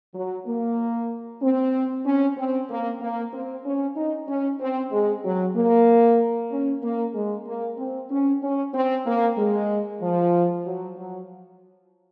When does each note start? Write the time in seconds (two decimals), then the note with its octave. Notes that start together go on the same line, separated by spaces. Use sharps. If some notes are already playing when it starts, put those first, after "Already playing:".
0.14 F#3
0.46 A#3
1.42 C4
2.05 C#4
2.37 C4
2.69 A#3
3.01 A#3
3.33 C4
3.65 C#4
3.96 D#4
4.27 C#4
4.60 C4
4.91 G#3
5.24 F#3
5.55 A#3
6.51 C#4
6.83 A#3
7.14 G#3
7.46 A#3
7.78 C4
8.10 C#4
8.42 C#4
8.74 C4
9.05 A#3
9.37 G#3
10.01 F3
10.65 F#3
10.96 F#3